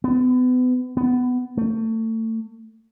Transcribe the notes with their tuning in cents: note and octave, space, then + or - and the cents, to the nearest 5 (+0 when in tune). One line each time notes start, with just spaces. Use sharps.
B3 +30
B3 +15
A3 +30